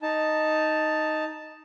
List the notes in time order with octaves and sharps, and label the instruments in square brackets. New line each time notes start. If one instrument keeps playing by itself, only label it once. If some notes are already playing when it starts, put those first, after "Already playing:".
[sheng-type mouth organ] D#4 A5